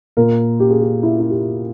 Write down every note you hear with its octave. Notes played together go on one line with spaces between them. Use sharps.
A#2 A#4
G4
G#4
G4
E4
E4
G4